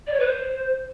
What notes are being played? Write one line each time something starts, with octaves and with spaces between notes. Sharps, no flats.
D5
C#5
B4
C5